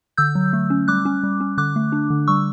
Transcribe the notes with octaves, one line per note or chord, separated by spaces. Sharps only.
D3 E6 G6
F#3
A3
C#4
G3 D6 F#6
C#4
G3
C#4
D3 D6 F#6
A3
D4
D3
G3 C#6 E6